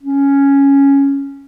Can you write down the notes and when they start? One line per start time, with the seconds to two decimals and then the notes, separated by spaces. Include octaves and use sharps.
0.03 C#4